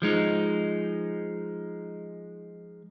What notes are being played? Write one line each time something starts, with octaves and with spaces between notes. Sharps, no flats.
F3 G#3 D#4